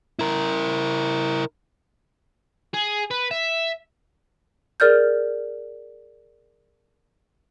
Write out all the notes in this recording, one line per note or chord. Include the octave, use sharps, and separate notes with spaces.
E4 A#4
G#4
B4
E5
G#4 A#4 D5 F6 G6